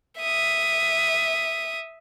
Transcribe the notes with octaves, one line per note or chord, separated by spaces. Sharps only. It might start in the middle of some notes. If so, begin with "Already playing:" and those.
E5 D#6